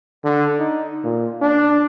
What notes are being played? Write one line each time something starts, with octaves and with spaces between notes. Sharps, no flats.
D3
D#4
A#2
D4